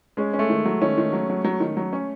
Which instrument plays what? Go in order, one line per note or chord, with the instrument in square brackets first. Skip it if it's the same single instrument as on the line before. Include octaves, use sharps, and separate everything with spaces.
[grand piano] G#3 [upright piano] C#4
[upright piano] C#4
[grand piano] A3
[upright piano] D#3
F#3
[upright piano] D#3 [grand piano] C#4
[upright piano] D#3
F#3
F#3
F#3
D#3
F#3
C#4